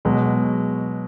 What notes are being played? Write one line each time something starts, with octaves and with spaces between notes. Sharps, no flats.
B2 F#3 G#3